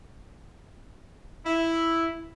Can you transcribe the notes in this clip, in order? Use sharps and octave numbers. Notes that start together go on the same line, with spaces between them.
E4